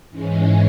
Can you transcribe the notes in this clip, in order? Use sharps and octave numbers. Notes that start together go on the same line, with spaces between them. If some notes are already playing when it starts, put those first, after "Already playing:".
G#2 E3 G#3 C#4